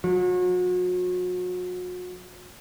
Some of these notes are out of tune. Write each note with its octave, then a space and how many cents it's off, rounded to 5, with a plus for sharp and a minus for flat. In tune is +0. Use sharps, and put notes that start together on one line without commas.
F#3 -40